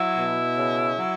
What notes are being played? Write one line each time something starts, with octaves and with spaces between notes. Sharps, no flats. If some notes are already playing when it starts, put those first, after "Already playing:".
Already playing: F#3 E4
B2
C#3
F#3